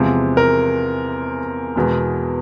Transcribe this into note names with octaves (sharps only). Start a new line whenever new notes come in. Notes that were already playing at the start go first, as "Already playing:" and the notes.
Already playing: E2 C3 F3 G#3
A#4
E2 B2 G#3